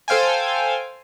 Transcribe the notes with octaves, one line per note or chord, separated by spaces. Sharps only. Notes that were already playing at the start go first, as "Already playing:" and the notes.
A4 C5 F5 G5 G#5